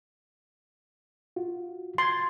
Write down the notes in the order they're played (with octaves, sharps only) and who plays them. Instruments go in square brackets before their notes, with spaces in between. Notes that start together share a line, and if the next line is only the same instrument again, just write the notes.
[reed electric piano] F4 F#4
[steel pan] C6 [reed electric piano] G#6 A6